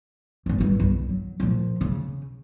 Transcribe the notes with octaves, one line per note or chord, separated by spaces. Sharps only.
D#1 G#1
G#1 G2
B1 G2
F#3
A#2 F3
C#3